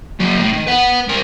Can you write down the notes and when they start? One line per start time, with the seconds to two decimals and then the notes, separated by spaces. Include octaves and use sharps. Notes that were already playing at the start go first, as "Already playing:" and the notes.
0.20 F#3 A#3
0.40 A2
0.54 D#3
0.67 B4 F#5
1.07 C2 A#4